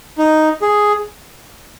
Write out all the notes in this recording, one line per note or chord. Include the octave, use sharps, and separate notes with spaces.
D#4
G#4